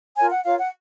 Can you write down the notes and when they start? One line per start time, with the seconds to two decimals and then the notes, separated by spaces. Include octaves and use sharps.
0.16 F4 A#4 C#5 G#5
0.31 F#5
0.44 F4 A#4 C#5 F5
0.58 F#5